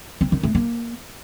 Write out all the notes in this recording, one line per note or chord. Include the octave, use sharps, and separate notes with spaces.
C4
D#3
A3
A#3